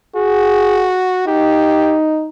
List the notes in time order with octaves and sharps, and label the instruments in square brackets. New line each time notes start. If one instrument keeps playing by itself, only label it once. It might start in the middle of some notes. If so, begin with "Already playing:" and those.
[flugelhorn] F#4 [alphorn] G#4
[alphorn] D#4 [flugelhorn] G4